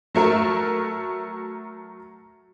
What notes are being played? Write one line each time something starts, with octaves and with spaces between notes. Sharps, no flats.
F#3 A3 A#4 E5